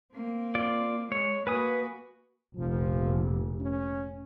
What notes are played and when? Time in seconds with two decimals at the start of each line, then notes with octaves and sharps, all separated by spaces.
0.13 A#3 C4
0.55 F4 D5
1.12 G#3 C#5
1.47 A#3 F#4 B4 G#5 D#6
2.55 F1 A#1 F3
3.60 C#4